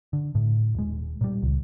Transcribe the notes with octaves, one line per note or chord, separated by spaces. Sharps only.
D3
A2
D#1 G#3
A#2 G3
C#2